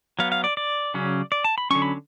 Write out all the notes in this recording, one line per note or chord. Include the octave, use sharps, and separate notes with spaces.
F#3 B3 F5
F5
D5
D5
C#3 F#3 C#4
D5
A5
B5
D3 F#3 C#4 C#6
B5